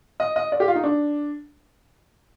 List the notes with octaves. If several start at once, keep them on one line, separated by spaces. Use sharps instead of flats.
D#5
D#5
D5
G4
F4
D#4
D4